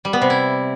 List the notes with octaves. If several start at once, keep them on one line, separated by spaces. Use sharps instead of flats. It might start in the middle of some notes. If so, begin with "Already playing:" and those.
G3
B3
C3
E4